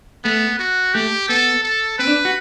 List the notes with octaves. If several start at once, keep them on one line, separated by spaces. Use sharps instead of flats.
A3 B3
F#4
A3 G4
B3 A4
A4
C4 B4
D4
F#4